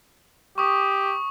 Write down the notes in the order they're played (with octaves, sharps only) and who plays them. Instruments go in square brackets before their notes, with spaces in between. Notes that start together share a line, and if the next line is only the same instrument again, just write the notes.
[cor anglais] G4 [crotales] C#6 D#6